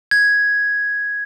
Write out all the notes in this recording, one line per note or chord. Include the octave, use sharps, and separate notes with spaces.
G#6